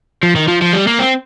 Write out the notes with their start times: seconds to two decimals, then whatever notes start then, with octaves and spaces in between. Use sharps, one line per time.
0.23 F3
0.36 D#3
0.48 F3
0.62 F3
0.73 G3
0.87 A#3
0.99 C4